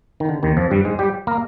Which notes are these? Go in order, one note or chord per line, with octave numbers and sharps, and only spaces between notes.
D#3
D3
D#2 D#3
F2 F3
G2 G3
G#2 G#3
G3 G4
A#3 A#4